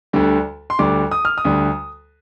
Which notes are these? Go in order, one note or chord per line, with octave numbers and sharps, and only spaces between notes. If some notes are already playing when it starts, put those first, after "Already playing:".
D2 D3 G3
C6
D2 D3 G3 D6
D#6
F6
D#6
D2 D3 G3